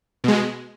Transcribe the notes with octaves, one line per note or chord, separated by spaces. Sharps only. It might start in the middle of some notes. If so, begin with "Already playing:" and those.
B2 G#3